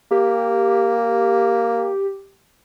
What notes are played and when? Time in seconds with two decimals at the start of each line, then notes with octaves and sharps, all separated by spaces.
0.11 A#3 G4